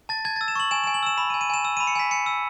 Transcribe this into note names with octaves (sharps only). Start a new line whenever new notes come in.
A5 A6
A5 G#6
E6 A6
E7
C#6 F#7
G#5 E7
G#5 E7
F#7
E6 E7
B5 E7
D#7
G#5
D#7
G#5 E7
E6 E7
B5 D#7
C#7
G#5 B6
G#5 C#7
E6